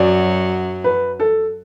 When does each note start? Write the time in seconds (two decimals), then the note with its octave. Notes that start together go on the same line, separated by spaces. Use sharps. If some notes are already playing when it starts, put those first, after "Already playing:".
Already playing: F#2 F#3 D5
0.84 B4
1.20 A4